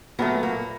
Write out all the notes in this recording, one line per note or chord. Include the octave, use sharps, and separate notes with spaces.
A#2 F#3 A3 B3
A#3